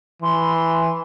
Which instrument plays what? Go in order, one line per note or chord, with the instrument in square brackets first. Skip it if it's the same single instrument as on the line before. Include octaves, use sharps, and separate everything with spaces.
[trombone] E3 [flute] C6